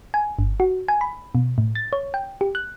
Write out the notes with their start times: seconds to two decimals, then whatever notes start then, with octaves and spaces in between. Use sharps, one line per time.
0.14 G#5
0.39 G1
0.60 F#4
0.88 G#5
1.01 B5
1.35 B2
1.58 A2
1.75 A6
1.93 C#5
2.14 G5
2.41 G4
2.55 F#6